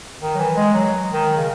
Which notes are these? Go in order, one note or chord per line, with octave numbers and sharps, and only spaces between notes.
D#3
F#3
E3
G#3
F#3
D#3
C#3